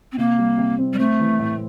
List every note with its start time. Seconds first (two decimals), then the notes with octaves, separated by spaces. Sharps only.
0.12 C4
0.18 C3 A#3
0.39 G3
0.58 C3
0.79 C4
0.93 G3
0.99 A3 C4
1.20 E3
1.39 A2